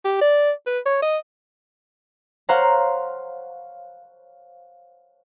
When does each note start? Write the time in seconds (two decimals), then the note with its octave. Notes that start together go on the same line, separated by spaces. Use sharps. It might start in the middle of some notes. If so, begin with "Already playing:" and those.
0.05 G4
0.21 D5
0.66 B4
0.86 C#5
1.02 D#5
2.49 C5 C#5 F5 F#5 A#5